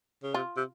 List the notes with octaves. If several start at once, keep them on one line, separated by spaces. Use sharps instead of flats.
C#3
C3 F4
C3